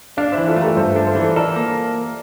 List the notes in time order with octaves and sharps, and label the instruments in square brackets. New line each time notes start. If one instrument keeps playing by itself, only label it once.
[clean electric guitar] D4 [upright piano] D5 F5
[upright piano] C5 E5
[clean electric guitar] E3
[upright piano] F4 A4
[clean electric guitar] A3
[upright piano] G4 A#4
[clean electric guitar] G2 [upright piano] A4 C5
[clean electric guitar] D4
[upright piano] A4 C5
[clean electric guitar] E3
[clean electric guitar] A4 [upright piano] A#4 D5
[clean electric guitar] A#3